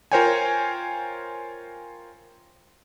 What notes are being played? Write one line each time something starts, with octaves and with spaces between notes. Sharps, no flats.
F4 A#4 C5 C#5 G5 G#5